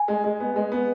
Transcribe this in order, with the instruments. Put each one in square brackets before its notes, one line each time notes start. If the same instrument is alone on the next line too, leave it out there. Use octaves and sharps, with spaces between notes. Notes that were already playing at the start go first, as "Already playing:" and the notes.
Already playing: [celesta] G#5
[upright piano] G#3
G#3
B3
G#3
B3